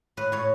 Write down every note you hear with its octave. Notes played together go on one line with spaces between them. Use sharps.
A2 B4
A2 C#5